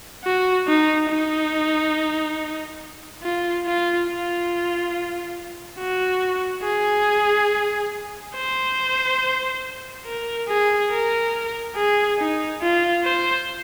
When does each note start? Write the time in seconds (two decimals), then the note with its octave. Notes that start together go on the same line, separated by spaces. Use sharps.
0.25 F#4
0.68 D#4
1.10 D#4
3.23 F4
3.66 F4
4.09 F4
5.79 F#4
6.64 G#4
8.36 C5
10.06 A#4
10.49 G#4
10.91 A#4
11.76 G#4
12.19 D#4
12.62 F4
13.04 C5